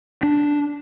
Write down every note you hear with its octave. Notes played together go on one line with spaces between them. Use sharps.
D4